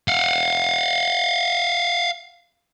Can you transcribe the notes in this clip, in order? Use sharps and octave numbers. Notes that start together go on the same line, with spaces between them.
F5 F#5